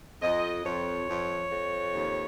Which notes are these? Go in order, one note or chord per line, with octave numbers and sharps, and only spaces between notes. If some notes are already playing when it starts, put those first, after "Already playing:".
F2 D#5
F2 C#5
F2
F2
D#2